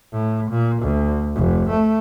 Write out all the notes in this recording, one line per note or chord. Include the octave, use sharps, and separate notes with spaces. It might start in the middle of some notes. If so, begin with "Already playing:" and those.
A2
A#2
D2
F1
A3